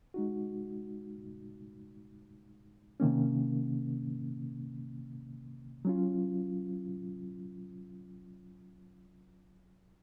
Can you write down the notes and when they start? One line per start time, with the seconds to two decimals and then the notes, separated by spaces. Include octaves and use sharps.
0.14 G#3 D#4 F#4
3.00 C3 D#3 A#3 C#4
5.85 F#3 C#4 F4